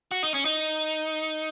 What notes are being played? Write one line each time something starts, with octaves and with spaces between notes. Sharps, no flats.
F#4
D#4
C#4
D#4